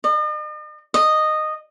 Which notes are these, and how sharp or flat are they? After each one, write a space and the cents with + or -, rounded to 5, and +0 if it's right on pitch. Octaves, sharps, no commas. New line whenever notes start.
D#5 -45
D#5 -10